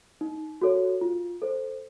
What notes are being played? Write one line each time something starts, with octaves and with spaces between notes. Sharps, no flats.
D#4
F#4 A4 C#5
F4
A4 C5